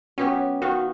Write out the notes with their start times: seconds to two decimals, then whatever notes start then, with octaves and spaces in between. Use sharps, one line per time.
0.18 F#3 B3 C#4 G4
0.62 D#3 B3 F#4 F5